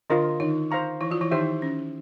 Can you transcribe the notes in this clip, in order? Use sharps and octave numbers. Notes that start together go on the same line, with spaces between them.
D3 D4 F4 A#4 D#5
D#3 D#4
C5 F5 A#5 C#6
E3 E4
F3 F4
E3 E4
D#3 D#4 G4 C5 E5
C#4